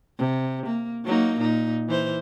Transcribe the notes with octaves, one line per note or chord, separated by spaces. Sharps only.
C3
A#3
F#3 A#3 D#4
A#2 D#4
E3 C5